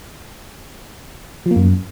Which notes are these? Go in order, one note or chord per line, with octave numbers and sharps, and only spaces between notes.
F3
A#3
F#2